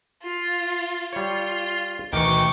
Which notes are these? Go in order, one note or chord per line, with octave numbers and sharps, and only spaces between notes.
F4
G3 F4 C#5
D2 B2 D#3 E3 G5 C#6 D6